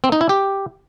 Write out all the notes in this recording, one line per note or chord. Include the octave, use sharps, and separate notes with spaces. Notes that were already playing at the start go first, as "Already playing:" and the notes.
C4
D#4
E4
G4